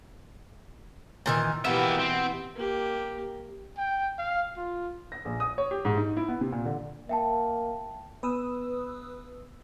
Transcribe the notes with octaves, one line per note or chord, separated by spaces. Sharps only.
A#2 D#3 E3
B2 E3 A#3 B3 G4 E5
C4
A#3 G4
G5
F5
F4
A#6
A#1
D#6
C#5
G4
G#2
D#4
E4
B3
C3
A#2
D3
A#3 E5 G5 A5
B3 B4 D#6 E6